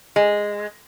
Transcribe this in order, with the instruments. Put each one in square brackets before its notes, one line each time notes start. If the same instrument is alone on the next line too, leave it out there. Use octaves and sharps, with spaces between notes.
[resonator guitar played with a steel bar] G#3